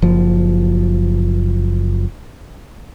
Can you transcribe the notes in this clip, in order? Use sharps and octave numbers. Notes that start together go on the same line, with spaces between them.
F#1 F3